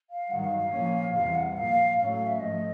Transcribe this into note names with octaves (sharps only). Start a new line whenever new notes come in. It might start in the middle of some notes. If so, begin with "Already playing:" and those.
F5
G2 D#3 F#3 F#5
F5
F5
A#2 F3 A#3 C#4
E2 C3 E3 G3 F5
F#5
A#2 F3 A#3 F5
A2 F#3 A3 C#4 F5
F5
E5
G#2 F3 A3 D#5